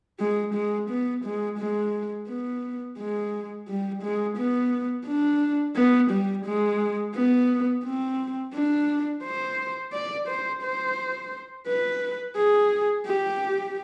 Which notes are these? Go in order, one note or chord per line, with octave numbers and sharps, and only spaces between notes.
G#3
G#3
B3
G#3
G#3
B3
G#3
G3
G#3
B3
D4
B3
G3
G#3
B3
C4
D4
C5
D5
C5
C5
B4
G#4
G4